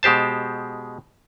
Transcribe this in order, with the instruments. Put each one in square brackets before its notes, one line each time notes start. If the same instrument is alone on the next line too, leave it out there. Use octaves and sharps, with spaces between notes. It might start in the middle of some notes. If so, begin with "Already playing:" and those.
[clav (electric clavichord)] B2 G#3 G4 C5 A5